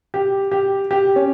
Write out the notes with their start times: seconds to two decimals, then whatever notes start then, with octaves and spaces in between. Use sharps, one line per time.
0.14 G4
0.51 G4
0.91 G4
1.16 C#4